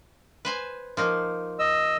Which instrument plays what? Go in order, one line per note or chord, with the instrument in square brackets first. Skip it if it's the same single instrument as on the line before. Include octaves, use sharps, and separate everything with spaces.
[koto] B4 C5 G#5
F3 A#3 D#4
[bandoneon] D#5 E6